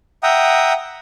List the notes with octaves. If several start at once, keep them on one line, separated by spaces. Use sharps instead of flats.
E5 F#5 G5 A#5 D#6